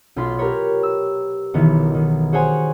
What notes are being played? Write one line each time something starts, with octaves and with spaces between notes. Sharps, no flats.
B1 F4 B5 C6
G4 A#4 B4 C#5
E6
B1 D#3 E3 B3
D#3
F#4 G#4 C5 C#5 F#5 G#5